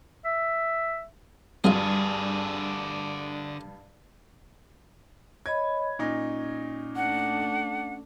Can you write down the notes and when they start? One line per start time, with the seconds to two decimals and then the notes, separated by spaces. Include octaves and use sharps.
0.25 E5
1.64 G2 D3 F#3 G#3 F4 G#4
5.46 C#5 D#5 B5 G#6
5.99 A#2 C#4 D#4
6.96 A3 D4 F#5